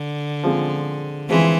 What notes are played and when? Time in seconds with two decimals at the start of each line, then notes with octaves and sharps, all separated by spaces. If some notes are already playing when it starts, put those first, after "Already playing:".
Already playing: D3
0.43 F3 G#3 C4
1.29 E3 F3 G#3 C4